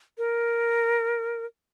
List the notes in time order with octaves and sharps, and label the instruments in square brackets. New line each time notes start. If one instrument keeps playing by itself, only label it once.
[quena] A#4